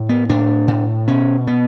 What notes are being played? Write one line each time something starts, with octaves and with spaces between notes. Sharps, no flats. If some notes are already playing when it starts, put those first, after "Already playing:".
Already playing: A2
B3
A2 D4
A2
B2 C#4
B2 B3